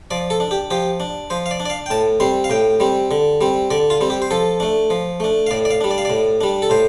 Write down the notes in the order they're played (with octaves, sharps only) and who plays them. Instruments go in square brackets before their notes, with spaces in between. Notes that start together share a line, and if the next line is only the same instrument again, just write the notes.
[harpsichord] F3 D5
A4
D4
G4
F3 G4
D4
F3 C5
F5
D5
D4
D5
F5
G5
A2 A5
G3 C4 C6
F5
A2 G5
G3 C4
D3
G3 C4
D3 D5
F4
G3 C4
G4
C5
F3 A4
A3 D4
F3
A3 D4
F5
A2 D5
D5
F5
G3 D4
D5
F5
A2 D5
G3 D4
A4
A2 C5